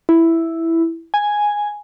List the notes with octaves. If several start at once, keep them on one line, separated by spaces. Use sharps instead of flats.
E4
G#5